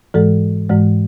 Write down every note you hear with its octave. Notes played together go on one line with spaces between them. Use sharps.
G#2 E3 G#3 A4
G#2 E3 G#3